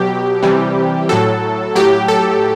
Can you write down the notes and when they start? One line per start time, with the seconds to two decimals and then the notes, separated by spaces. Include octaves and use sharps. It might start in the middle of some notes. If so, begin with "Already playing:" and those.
Already playing: B2 F#3 G4
0.43 C3 E3 G3
1.09 A2 F#3 A4
1.75 A2 F#3 G4
2.08 A4